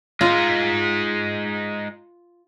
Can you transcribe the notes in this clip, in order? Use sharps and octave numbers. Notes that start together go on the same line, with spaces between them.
G#3 D#4 F4